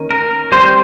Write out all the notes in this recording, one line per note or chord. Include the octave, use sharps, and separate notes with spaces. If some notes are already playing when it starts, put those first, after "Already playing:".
Already playing: D#3 A#3 C#4
A#4
G3 C4 C5